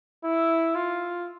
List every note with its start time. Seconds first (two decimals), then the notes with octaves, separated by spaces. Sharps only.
0.24 E4
0.75 F4